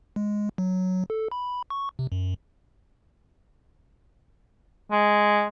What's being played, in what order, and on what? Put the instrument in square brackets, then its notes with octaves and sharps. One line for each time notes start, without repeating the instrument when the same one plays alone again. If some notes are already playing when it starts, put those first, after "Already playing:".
[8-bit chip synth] G#3
F#3
A4
B5
C#6
C3
F#2
[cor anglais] G#3